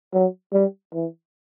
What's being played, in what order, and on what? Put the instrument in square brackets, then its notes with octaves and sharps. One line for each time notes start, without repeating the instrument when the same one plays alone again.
[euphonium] F#3
G3
E3